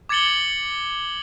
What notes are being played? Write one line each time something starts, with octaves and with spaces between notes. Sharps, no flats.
D6 G#6 A6 C#7 F#7 G7